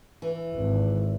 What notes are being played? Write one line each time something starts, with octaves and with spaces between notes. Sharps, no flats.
E3
G#1